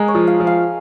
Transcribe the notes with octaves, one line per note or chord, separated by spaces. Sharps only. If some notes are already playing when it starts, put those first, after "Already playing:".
Already playing: G#3 G#4 A#4 D#5
C#5
F3
F5
F3
F5